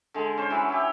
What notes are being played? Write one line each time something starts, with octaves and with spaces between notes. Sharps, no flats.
D3 G#3
C#4 C5
E3 F#3 B4
E4 G4